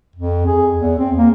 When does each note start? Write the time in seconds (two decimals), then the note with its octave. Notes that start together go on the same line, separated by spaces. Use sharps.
0.16 F2
0.46 G#4
0.77 E2
0.99 C4
1.18 A#3